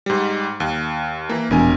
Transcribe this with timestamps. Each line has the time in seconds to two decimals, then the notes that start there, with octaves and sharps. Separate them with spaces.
0.06 G#2 G3
0.60 D#2
1.29 E3 A#3
1.51 E1 A#1 A#4 G#5